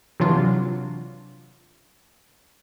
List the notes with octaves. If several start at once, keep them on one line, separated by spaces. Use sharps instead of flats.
C3 E3 F#3 D4 F4